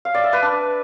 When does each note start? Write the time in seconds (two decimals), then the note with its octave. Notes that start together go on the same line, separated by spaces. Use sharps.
0.05 F5
0.14 D5
0.24 E5
0.33 B4
0.42 D4